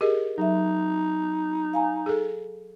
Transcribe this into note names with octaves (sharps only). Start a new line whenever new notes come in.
G4 G#4 A#4 D#5
F#3 D#4 E5
F5 G#5 A#5
G#4 A4